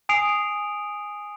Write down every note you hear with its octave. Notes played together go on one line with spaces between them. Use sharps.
G#5 D#6 C7 D7 F7